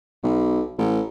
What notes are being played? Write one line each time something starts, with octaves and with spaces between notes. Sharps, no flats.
B1
A1